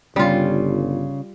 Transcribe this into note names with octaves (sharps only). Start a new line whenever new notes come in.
G1 C#3 G3 C#4 F4